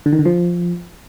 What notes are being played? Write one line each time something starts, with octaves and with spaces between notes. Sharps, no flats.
D3
D#3
D3
F3